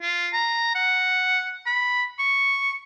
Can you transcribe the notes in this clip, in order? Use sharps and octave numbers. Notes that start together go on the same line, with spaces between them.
F4
A#5
F#5
B5
C#6